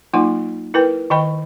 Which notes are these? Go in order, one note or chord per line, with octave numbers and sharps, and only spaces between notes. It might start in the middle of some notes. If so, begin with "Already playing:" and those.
F#3 A#3 D#4 F4 F#5 C6
E4 A#4 B4 G5
D#3 D#5 G5 B5 C#6